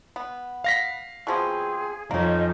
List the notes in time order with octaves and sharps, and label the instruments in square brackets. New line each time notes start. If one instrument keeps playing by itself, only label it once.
[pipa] B3
[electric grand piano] F5 A#6 B6
[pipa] B2 F3 C4 [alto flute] G#4
[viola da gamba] F2 [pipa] A#3 C#4 [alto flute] D#4